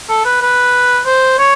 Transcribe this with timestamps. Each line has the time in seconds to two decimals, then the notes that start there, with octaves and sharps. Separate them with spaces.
0.09 A4
0.25 B4
0.42 B4
1.06 C5
1.38 C#5